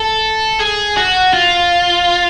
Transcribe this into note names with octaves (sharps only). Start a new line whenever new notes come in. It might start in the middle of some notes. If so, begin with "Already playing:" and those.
Already playing: A4
G#4
F#4
F4